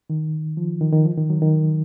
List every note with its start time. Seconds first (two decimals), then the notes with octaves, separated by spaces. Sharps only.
0.10 D#3
0.57 F3
0.81 D#3
0.93 D#3
1.05 F3
1.18 D#3
1.30 F#3
1.42 D#3